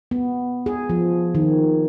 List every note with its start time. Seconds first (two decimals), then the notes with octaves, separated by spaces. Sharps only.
0.11 B3
0.66 G#4
0.90 F3
1.35 D#3